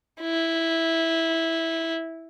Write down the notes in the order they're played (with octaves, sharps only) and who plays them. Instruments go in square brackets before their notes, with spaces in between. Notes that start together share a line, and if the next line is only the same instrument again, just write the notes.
[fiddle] E4